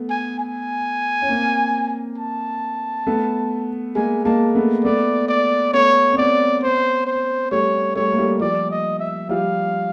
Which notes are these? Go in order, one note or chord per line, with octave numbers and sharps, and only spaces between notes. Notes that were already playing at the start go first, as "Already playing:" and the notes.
Already playing: A3 B3
G#5
G#5
C#4
A#3 C4
A5
A3 B3
G#3 A#3 G#5
G#3 A#3 A5
A3 B3
A3 B3 D5
D5
A3 B3 C#5
C4
B3 C#4 D5
C5
C5
G3 A3 C#5
G3 A3 C#5
A#3
G3 A3
F3 G3 D5
D#5
E5
F3 G3 F5